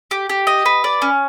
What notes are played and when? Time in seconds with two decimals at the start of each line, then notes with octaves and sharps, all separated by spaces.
0.11 G4
0.29 G4
0.47 D#5
0.66 B4
0.84 D5
1.02 C#4